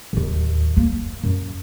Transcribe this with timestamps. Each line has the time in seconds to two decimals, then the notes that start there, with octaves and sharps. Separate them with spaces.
0.13 D1 D#2
0.77 A#3
1.23 F#2